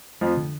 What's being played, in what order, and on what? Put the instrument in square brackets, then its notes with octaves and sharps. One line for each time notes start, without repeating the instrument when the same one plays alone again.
[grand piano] F2 F3 [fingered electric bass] A3
[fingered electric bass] D3